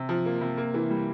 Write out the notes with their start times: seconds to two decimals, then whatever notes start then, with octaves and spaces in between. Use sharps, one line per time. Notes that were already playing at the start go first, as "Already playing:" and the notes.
Already playing: C3
0.09 F3
0.26 A#3
0.41 C3
0.57 A#3
0.74 E3
0.90 G3